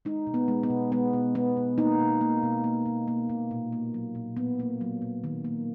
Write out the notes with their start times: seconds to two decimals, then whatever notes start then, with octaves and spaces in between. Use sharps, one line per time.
0.05 G#3 D#4
0.27 B2
0.34 B3
0.48 G#3
0.63 B3
0.70 B2
0.92 G#3 B3
1.13 B2
1.35 G#3 B3
1.57 B2
1.78 A#3 D#4
2.00 B2
2.21 A#3
2.43 B2
2.64 A#3
2.86 B2
3.08 A#3
3.30 B2
3.51 A#2
3.72 A#3
3.94 F#3
4.15 A#2
4.37 A#2 B3
4.59 A#3
4.81 F#3
5.02 A#2
5.24 D#3
5.45 A#3